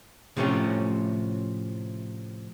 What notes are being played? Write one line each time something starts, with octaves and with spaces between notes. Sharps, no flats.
A2 C3 F3 A3 C4 C#4